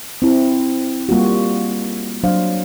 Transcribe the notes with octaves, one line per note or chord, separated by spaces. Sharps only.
C4 E4
G3 A#3 F4 F#4
F#3 D4 C5 F5